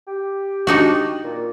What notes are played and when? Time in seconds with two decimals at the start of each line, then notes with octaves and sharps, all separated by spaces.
0.08 G4
0.67 D4 D#4 F#4
1.24 A#2